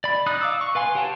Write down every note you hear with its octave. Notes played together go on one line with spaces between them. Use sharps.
D5 B5
D#4 D5 D#6 F#6
F5 D6 E6
C#6
B4 F5 G#5 C6
G4 C#5 F#5 G5 A5